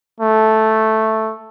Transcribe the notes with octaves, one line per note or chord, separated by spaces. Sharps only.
A3